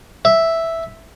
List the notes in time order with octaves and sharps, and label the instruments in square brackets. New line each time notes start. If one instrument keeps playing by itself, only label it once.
[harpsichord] E5